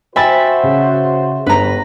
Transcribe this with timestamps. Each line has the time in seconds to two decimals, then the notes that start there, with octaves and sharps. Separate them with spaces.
0.16 F#4 C5 E5 G5 G#5 B5 A6
0.63 C#3
1.46 G1 B4 A#5